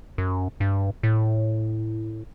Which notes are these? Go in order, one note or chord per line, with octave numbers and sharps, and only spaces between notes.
F#2
G2
A2